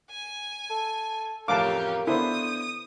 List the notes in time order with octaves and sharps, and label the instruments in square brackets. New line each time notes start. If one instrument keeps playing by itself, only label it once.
[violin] G#5
[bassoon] A4
[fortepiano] A1 F2 F5 [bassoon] A#3 [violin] G4 C#5 [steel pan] A5 D6
[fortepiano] D3 B3 C5 [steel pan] E4 [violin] D#6